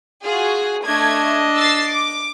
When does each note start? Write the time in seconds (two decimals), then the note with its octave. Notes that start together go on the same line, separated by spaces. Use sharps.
0.24 F4 F#4 G#4
0.86 A3 D4 D#5 G#6
1.55 E6 A6 C7
1.89 D6